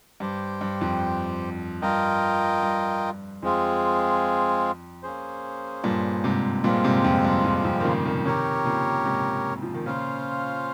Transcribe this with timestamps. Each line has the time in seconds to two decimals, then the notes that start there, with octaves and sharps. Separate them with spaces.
0.20 G2 G4 C5 G5
0.61 G2
0.81 F2
1.82 G2 F4 A#4 D#5 G5
2.63 G2
3.43 F2 G#3 C4 F4 G#4
5.03 A#3 C#4 G#4 C5
5.84 G2 A#2
6.24 G#2 C3
6.64 G2 A#2 G#3 C4 F4
6.84 G#2 C3
6.94 G2
7.04 F2
7.24 G2
7.44 F2
7.64 F2
7.80 D#3
7.85 A#2 C#3
8.05 C3 D#3
8.25 C3 D#3 G4 A#4 C#5
8.65 A#2 C#3
9.05 G#2 C3
9.62 F3
9.74 D#3
9.86 A#2 C#3 C#4 F4 C5 F5